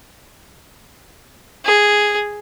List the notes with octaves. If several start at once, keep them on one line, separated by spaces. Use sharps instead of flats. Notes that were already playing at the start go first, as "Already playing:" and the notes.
G#4